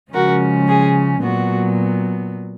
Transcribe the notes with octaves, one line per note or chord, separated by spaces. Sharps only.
C#3 F3 G#3 C#4 F#4 A#4
G#4
A#2 F#3 B3 F#4